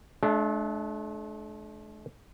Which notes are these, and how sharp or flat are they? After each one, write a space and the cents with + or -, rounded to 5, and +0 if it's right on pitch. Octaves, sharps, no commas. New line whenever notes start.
A3 -45 D4 +5 E5 +35